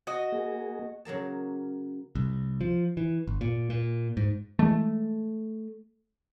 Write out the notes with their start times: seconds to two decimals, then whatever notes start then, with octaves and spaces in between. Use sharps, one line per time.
0.07 F#4 D#5
0.32 A#3 G#4
1.05 C#3 F#3 A#3 A5
2.15 C2
2.61 F3
2.97 E3
3.27 G1
3.41 A#2
3.70 A#2
4.17 G#2
4.59 E3 G#3 A3